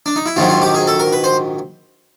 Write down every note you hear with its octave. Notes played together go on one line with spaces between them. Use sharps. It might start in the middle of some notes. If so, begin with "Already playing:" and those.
D4
D#4
E4
A#1 G#2 D#3 F#3 F4
F4
G4
G#4
A4
A#4
B4
C5